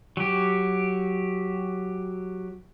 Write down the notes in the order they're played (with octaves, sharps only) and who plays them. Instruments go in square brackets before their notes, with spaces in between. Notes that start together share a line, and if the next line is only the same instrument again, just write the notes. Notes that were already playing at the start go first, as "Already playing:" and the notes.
[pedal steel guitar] F#3 G4